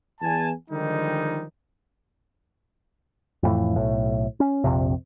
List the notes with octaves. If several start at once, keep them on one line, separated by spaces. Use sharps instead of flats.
E2 G#5 A5
D3 D#3 F3 G3 G#3 D#4
F2 A2 E3
B1 A2
C#4
A#1 F2 C3